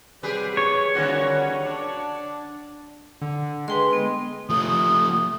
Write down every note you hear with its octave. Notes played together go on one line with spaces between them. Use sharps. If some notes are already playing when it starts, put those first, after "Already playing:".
C3 F#3 G3 G4 G#4 B4
C#5
D3 F3 G3 A#3 C#4 F#4
D4
D3
G#3 B4 G5 C6
B3
F3 A3 D#6